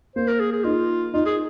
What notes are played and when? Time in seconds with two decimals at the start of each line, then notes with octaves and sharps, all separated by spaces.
0.16 A#3 C5
0.28 A#4
0.40 G#4
0.52 G#4
0.64 D#4 F4
1.14 D#4 F4
1.26 G#4